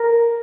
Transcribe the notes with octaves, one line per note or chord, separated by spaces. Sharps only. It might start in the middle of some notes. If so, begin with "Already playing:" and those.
Already playing: A#4